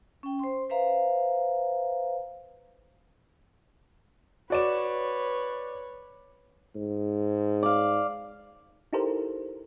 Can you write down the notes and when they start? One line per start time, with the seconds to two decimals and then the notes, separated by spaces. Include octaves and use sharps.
0.23 C#4 G5
0.39 C5 C6
0.69 B4 C5 E5 F5 A#5
4.50 F#4 B4 C#5 D5 E7
6.75 G#2
7.63 D5 F5
8.93 D#4 E4 G4 A4 A#4 C5